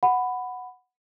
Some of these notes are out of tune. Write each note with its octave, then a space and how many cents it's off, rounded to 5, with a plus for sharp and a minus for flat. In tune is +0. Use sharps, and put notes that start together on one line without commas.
F#5 -5 B5 +10